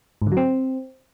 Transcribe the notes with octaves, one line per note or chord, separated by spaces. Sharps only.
G#2
D3
F#3
C4